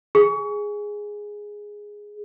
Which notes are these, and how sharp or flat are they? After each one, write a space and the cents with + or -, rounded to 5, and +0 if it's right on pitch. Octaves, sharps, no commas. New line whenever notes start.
G#4 -5